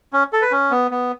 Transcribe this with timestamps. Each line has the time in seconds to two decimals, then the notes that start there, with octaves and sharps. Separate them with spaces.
0.13 C#4
0.33 A4
0.42 B4
0.52 C#4
0.71 B3
0.91 B3